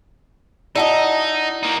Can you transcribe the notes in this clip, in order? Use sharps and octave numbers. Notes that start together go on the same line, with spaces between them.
D#4 E4 F#4 D5 D#5 A5
A#3 D#4